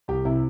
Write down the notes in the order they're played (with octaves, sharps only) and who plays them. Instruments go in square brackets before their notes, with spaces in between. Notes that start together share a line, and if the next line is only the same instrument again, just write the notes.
[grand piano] C2 G4
C3 E4